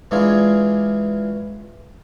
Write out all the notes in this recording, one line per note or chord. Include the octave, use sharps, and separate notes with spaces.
E3 G#3 D4 F4 G#4 C#5